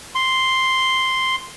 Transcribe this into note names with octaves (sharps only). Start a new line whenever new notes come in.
C6